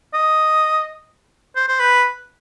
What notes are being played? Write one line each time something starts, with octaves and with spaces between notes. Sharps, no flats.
D#5
C5
C5
B4